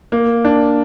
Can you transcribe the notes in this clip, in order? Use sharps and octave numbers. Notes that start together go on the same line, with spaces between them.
A#3
D4